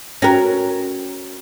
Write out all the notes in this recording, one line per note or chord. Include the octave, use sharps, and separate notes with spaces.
C#4 F#4 A#4 G5 A#6